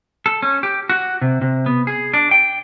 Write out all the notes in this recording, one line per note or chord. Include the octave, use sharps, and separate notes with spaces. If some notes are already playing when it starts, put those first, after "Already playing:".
A4
C#4
G4
F#4
C3
C3
B3
G#4
D4
G5